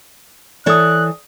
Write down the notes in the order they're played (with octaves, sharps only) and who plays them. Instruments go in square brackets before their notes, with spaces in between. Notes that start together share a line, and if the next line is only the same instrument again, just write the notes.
[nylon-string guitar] E3 A4 C#5 [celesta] D5 D#6 [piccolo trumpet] F#6